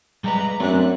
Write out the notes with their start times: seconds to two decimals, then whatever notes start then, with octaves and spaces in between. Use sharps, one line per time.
0.24 G3 G#3 B4 A#5
0.60 F#2 A3 A#3 C4 D4 F#6